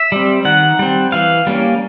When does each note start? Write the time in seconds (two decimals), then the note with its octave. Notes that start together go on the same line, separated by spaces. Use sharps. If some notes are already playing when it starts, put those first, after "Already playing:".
Already playing: E5
0.12 G3 C4
0.45 D#3 F#5
0.79 G3 C4
1.12 E3 F5
1.47 G3 A#3 C#4